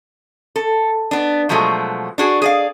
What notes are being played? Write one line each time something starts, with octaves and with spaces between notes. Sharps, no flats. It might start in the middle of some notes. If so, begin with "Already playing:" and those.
A4
B3 D4
B2 F3 F#3 G#3 A3
D4 F#4 G#4
G#4 D5 F5